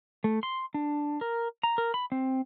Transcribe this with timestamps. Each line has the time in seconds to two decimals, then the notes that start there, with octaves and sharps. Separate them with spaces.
0.24 A3
0.43 C6
0.74 D4
1.21 A#4
1.63 A#5
1.78 A#4
1.94 B5
2.12 C4